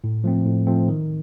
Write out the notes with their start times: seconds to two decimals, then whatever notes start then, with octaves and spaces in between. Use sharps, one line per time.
0.04 A2
0.24 F3 A3 C4
0.46 A2
0.67 F3 A3 C4
0.88 D#3